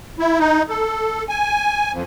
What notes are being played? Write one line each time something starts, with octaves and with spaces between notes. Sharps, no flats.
E4
D#4
A4
G#5
F2